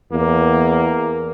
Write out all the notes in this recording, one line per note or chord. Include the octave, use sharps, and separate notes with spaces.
E2 A#3